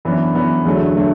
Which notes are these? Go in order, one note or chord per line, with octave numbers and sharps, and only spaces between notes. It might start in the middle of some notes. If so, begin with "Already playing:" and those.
F#2 E3 B3 D4
F#2 E3 B3 D4
E2 D3 F#3 A3
D3 F#3 A3